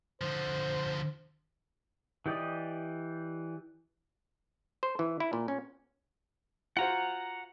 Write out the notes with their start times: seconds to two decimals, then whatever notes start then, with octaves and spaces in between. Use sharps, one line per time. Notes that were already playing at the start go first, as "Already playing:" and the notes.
0.21 D3 F3 C5
2.26 E3 G4 D5 D#5
4.83 C5
4.99 E3
5.20 E4
5.33 A#2
5.48 C#4
6.77 F4 F#4 C5 F#5 A#5